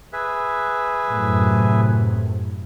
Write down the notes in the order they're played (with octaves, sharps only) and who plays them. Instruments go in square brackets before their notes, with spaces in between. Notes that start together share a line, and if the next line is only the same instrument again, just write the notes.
[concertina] G#4 B4 E5
[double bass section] F#2 A2 C3